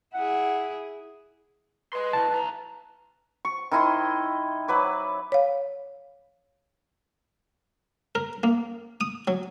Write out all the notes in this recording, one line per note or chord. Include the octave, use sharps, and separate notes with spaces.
E4 G#4 F#5
B4 D#5 C6
B2 E3 A5
B1 A#5
C#6
D#3 E4 D#5 C6
F#3 B4 D6
C#5 F5
A#4
A#3
D#6
F#3